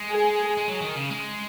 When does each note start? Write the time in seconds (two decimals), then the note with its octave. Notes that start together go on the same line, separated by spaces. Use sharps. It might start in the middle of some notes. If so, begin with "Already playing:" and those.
Already playing: G#3
0.11 G#4
0.57 G#3
0.68 F#3
0.82 D#3
0.96 C#3
1.10 G#3